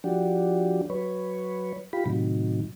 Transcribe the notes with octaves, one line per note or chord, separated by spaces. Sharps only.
F3 D4 F#4 G4
F#3 B4 C#5
F4 G4 B5
A2 C3 D#3 F#3